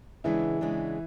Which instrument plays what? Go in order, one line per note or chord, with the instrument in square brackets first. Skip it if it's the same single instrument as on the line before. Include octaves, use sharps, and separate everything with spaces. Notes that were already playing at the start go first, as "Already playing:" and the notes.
[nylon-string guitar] C#3 G#3 B3 D4 [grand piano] E3 E4
[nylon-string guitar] C#3 G#3 B3 D4